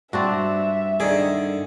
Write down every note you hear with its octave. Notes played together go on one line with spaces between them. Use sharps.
G2 C4 D4 F#4 E5
D3 D#3 G#4